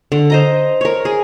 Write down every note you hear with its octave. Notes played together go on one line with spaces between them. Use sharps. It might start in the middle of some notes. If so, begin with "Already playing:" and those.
D3
C5 D#5 A#5
A#4 C#5
G#4